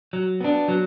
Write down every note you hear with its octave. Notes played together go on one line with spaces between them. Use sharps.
F#3
B3 D4
F#3